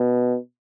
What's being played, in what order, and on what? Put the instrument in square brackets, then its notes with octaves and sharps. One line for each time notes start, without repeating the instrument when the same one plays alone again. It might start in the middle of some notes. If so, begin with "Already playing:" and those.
Already playing: [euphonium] B2